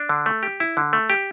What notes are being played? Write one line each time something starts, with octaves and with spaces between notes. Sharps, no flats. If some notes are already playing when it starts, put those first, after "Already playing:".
Already playing: D4
D3
A3
G4
E4
D3
A3
G4